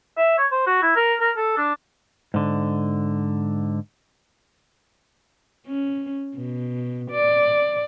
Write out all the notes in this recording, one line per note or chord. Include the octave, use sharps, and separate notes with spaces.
E5
C#5
C5
F#4
E4
A#4
A#4
A4
D4
G#2 D3
C#4
B2
D5